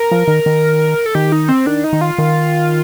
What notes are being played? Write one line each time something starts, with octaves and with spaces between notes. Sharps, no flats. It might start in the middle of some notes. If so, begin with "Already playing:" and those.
Already playing: A#4
F3
D#3
D#3
A4
D#3 G4
D#4
C4
D#3 D4
D#4
D#3
F4
D#3